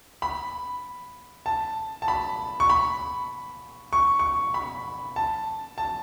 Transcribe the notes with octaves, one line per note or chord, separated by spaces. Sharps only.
B5
A5
A5
B5
C#6
B5
C#6
C#6
B5
A5
A5